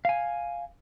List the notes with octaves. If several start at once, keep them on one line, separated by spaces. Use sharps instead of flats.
F5 G#5